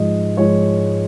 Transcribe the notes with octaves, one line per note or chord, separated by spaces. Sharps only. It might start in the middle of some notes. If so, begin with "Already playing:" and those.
Already playing: G#2 F3 G#3 D#5
G#2 F3 G#3 C#5